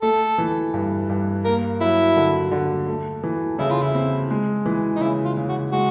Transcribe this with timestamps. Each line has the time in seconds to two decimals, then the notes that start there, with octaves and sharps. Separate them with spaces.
0.02 A3 A4
0.38 E3
0.74 G2
1.09 G2
1.45 A#3 A#4
1.81 F#3 E4
2.16 D3
2.52 D3
2.88 A3
3.23 E3
3.59 C#3 E4
3.70 F4
3.82 E4
3.95 C4
4.30 G#3
4.66 E3
4.96 D#4
5.01 C#3 E4
5.25 F4
5.37 C#3
5.49 F#4
5.72 G#3 F#4